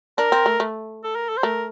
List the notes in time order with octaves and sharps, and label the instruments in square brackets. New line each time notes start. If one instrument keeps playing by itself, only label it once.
[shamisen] D4 [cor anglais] A#4
[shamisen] C4
A3
A3
[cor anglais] A4
A#4
A4
C5
[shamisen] A3 [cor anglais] A#4